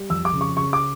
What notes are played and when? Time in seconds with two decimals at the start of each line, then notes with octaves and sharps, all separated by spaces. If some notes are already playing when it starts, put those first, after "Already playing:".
Already playing: G3
0.10 F2 E6
0.25 D6
0.33 C#3
0.41 C#6
0.57 C#3 C#6
0.73 D6